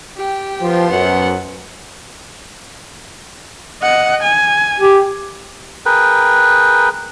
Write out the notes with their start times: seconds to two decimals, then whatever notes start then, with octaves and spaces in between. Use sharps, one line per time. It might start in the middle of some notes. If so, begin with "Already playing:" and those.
0.17 G4 G5
0.61 F3 B3 C5
0.90 F#2 F#5
3.82 D#5 F#5
4.22 G#5
4.80 G4
5.86 G#4 A#4 B4 G5